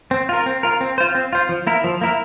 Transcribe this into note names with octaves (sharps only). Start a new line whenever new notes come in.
C4
F4 A#4
C4
F4 A#4
C4
F4 C5
C4
F4 C5
F3
A#3 E4 A#4
F3
A#3 E4 A#4